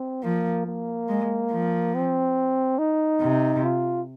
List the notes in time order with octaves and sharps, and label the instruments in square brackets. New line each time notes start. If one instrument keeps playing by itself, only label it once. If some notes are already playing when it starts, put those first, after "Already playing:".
Already playing: [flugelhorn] C4
[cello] F3 [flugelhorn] A#3
[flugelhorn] A#3
[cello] G#3
F3
[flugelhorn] C4
D#4
[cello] C3
[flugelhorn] F4